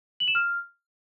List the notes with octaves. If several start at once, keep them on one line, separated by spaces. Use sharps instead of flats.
F#7
E7
F6